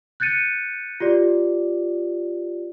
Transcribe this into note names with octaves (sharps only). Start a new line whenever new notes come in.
F#6 G6 A6 C#7 D#7
F4 G4 D5